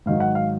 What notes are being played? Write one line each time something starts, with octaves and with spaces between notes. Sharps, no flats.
G#2 D#3 F#3 F5
F#5
F5